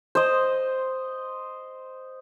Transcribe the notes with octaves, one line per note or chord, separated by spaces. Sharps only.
C5 D#5